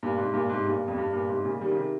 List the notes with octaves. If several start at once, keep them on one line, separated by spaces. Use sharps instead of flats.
G2 A#2
G#2 C3
G2 A#2
G#2 C3
G2 A#2
F2
G2
G2 A#2
G#2 C3
C3
A#2 C#3
D#3 G3
C#3
C3 D#3